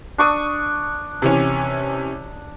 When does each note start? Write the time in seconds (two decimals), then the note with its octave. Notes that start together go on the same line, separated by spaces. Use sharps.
0.18 D4 C#6 D#6
1.22 C3 E3 C#4